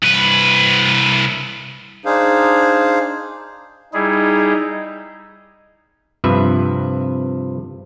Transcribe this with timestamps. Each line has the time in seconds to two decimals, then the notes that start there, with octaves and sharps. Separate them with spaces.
0.03 C2 B4
2.05 D4 D#4 G#4 C5 F5
3.94 G3 D#4 E4 G#4
6.24 G2 C3 F3 B4 E5